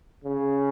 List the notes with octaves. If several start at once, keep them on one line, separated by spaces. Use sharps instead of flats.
C#3